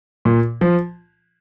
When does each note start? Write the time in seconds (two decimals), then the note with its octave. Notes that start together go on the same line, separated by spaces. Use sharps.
0.25 A#2
0.61 F3